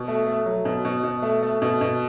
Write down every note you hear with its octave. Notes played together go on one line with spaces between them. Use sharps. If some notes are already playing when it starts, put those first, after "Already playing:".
Already playing: B2
A3
A3
F#3
B2
B2
B2
A3
A3
B2
B2